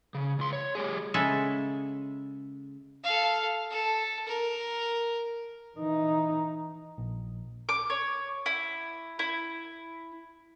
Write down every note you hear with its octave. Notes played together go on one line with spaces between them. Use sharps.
C#3
C#2 C6
C#5
G3 G#4
C#3 G#3 A4 E5
A4 F5
A4
A#4
E3 D#4
A#1
D6
C#5
E4
E4